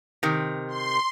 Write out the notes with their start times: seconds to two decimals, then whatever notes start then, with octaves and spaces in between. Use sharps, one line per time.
0.23 C3 D#3
0.69 C6